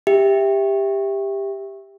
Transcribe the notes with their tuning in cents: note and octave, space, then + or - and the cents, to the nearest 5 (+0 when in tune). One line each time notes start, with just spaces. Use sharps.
G4 +15 E5 +0